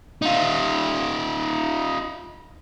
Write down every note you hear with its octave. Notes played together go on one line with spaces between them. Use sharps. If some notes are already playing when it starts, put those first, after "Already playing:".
D#4 F4